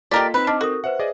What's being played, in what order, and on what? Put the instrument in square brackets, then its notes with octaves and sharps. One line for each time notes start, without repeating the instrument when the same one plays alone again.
[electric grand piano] A#3 F4 A4 [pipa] G4 A#4 D5 [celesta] D#5 B6
[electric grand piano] C4 D#4 [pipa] B4 [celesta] B5
[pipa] D4 [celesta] D#5 D6 F6
[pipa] F#4 [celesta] A4 A#4 D#6
[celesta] B4 C5 E5 [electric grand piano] F#5
[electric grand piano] G#4 D5 D#5